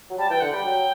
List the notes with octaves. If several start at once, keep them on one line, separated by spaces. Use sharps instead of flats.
F#3
G3 A5
E3 G5
D3 F#5
G3 G5
F#3